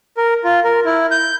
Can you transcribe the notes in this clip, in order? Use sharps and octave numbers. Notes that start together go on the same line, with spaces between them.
A#4
F4
A#4
E4
G6